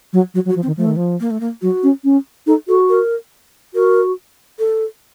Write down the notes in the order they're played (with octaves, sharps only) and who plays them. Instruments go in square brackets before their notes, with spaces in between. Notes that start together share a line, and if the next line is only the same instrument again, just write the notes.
[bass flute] F#3
[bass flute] F#3 [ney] F#4
[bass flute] F#3
[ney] F#4
[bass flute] F3
[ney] C4
[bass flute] D#3
[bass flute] F3 [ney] A3
[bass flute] D#3
F3
[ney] A#3
A3
A#3
[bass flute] F#3 [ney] F#4
[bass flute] C#4
C#4
[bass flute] D#4 [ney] A4
[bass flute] F#4 [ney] A4
[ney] A#4
[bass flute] F#4 [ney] A#4
[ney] A4